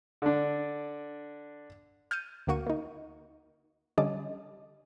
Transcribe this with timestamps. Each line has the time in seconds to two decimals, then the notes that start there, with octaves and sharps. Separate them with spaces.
0.22 D3 D4
2.11 F6 G6 A6 C#7 D#7
2.47 D2 D3 A#3 F#4 C#6 D#7
2.67 A#3 D#4
3.98 D3 G3 C#4 D#5 A5 D6